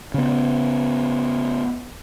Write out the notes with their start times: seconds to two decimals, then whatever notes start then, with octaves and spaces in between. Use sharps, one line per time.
0.14 C#3 B3